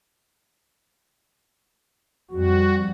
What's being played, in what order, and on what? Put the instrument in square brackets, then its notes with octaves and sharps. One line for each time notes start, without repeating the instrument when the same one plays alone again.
[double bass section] F2 G3 [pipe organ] F#4